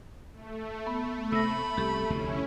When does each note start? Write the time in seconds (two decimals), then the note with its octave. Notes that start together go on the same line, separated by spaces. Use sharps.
0.34 A3
0.87 B3
1.32 C3 B5 E6 A#6
1.77 C2 G4 A4
2.10 F1 D2 C3 C#4 E4